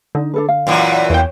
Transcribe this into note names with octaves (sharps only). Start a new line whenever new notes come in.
D3 D#4
D4 A4 B4
F5
F#2 A#2 E3
E2 C#5 G5